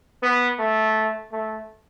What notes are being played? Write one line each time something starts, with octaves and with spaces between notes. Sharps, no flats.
B3
A3
A3